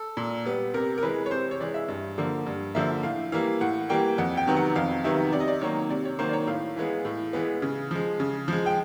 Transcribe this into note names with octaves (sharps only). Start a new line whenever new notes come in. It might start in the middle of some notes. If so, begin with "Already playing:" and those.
Already playing: A4
A#2
G3 B3
C3 A#4
A#4
E3 G#3 B4
C#5
C3 C5
C#5
E3 G#3 D5
E5
G2
D3 F3 A#3
G2
D3 F3 A#3 E5
A2 F5
E3 G3 A#3 F5
A2 F#5
E3 G3 A#3 G5
F2 F#5
G5
C3 D#3 F#3 B3
F#5
F2 F5
C3 D#3 F#3 B3 E5
C3 D5
D#5
D5
D#3 F#3 A#3 C#5
C3 D5
C#5
D#3 F#3 A#3 C5
D5
C#5
A2 F5
E3 G#3 B3
A2
E3 G#3 B3
C#3
F3 G#3
C#3
F3 G#3
G5